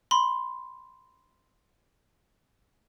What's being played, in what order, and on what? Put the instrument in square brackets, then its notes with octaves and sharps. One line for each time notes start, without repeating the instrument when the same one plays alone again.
[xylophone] B5 C6